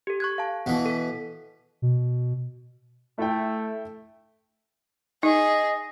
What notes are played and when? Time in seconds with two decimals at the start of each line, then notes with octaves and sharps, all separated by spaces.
0.07 G4 A4
0.20 C#6 F#6 G#6
0.38 F5 A5
0.66 B2 E3
0.86 A4 B6
1.82 B2
3.18 A3 E4 G5
5.23 D#4 G#4 D#5